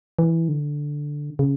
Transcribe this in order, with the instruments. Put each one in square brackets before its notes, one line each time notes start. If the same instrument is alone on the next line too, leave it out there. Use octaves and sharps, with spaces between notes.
[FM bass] E3
D3
C#3